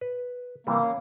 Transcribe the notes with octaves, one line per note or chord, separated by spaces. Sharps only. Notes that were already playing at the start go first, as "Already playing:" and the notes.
B4
C3 E3 G3 A#3
C#4